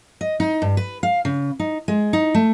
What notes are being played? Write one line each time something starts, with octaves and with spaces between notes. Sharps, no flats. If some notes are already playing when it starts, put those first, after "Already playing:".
D#5
D#4
G2
B4
F5
C#3
D#4
G#3
D#4
A3